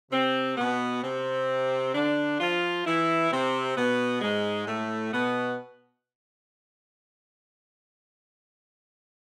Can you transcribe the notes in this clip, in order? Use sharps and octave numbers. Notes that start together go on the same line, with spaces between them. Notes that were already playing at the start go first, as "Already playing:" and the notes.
C3 C4
B2 B3
C3 C4
D3 D4
F3 F4
E3 E4
C3 C4
B2 B3
G#2 G#3
A2 A3
B2 B3